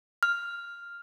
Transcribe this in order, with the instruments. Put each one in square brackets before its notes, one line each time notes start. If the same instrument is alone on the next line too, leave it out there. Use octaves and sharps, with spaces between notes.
[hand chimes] F6